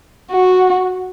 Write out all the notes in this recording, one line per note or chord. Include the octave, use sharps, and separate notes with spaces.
F#4